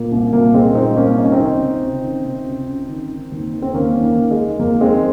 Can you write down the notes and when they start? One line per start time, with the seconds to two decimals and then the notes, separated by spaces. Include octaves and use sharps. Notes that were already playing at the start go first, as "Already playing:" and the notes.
Already playing: A#2 A#3
0.12 C2
0.33 A#2 A#3
0.54 C2 G#3 C4
0.75 A#2 C4 D#4
0.97 C2 A#3 C#4
1.18 C#2 D#4
1.25 C#4
1.32 C4 D#4
1.40 D#3
1.61 C3
1.82 C#2
2.03 D#3
2.25 C3
2.46 C#2
2.68 C#2
2.89 D#3
3.10 D#3
3.32 D#2
3.53 D#3
3.62 C4
3.74 D#2 A#3 C#4
3.95 D#2
4.02 A#3
4.17 D#3
4.31 G#3
4.38 D#3
4.59 F2 A#3
4.81 D#3 G#3 C4